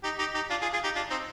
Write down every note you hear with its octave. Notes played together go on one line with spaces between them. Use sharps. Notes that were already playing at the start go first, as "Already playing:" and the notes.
D#4 G4
D#4 G4
D#4 G4
D4 F4
F4 G#4
F4 G#4
D#4 G4
D4 F4
C4 D#4